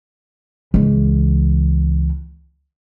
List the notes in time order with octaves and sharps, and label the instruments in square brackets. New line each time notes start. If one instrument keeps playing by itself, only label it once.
[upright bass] C#2 E3